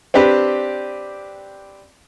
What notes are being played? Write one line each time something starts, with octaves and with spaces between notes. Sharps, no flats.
C4 D4 G4 B4